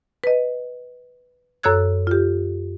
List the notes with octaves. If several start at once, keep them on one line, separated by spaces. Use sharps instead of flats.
B4 D#5
F#2 A4 C#5 E6 F#6 G#6
F4 G4